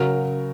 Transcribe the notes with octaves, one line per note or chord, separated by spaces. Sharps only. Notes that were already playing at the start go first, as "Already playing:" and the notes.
Already playing: C#3 F#3 F#4 A#4